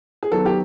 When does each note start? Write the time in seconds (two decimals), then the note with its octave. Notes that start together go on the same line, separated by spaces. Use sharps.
0.23 G#4
0.31 D#3 F#3 B3 A4
0.46 G4